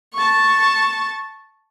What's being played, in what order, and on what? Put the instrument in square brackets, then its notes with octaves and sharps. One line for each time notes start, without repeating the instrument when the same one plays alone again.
[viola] A5 C#6